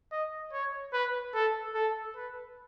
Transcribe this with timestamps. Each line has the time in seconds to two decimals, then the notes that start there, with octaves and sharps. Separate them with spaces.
0.12 D#5
0.53 C#5
0.93 B4
1.34 A4
1.75 A4
2.16 B4